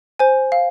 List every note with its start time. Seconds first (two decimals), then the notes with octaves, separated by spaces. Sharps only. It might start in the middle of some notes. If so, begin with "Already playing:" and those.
0.19 C5 G#5
0.52 F5